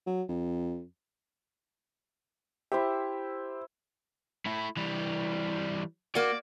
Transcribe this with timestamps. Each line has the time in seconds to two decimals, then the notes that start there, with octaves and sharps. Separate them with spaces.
0.07 F#3
0.29 F2
2.72 E4 G4 C5 E5
4.46 A3 E4
4.77 E3 G3
6.15 A#3 F#4 D5